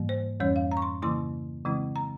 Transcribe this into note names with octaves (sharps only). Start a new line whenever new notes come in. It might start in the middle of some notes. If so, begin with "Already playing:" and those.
Already playing: G#2 E3 G3 A#3
C5
F2 E3 G3 C#4 C#5
F5
A#5
C#6
C6
C#3 E3 A#3 E4 C6
C#3 E3 G#3 C4 E4
A#5